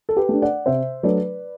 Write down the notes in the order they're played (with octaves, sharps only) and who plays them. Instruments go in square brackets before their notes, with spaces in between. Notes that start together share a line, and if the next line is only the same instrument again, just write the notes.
[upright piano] A4
G4 B4
A3 D4
D5 F#5
C3 C5 E5
F#3 A3 D4 B4 D5